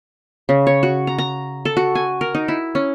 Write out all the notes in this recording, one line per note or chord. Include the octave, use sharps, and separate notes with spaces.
C#3
C#5
F#4
A#5
A#5
A4
F#4
G#5
A#4
D#4
E4
C#4